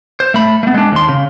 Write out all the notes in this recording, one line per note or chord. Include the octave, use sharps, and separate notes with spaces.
C5
A3 B5
A3 B3
G#3 D4
D#2 C6
C#3